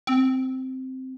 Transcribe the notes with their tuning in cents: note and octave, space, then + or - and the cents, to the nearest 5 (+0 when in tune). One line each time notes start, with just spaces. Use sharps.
C4 -5